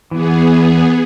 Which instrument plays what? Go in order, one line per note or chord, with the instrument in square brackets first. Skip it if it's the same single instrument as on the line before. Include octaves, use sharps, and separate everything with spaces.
[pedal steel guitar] E3 [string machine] B3 G#4